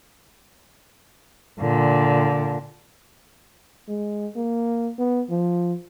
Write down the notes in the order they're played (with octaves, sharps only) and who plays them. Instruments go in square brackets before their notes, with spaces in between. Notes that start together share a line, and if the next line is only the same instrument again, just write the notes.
[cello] A#2 D3
[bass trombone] G#3
A#3
B3
F3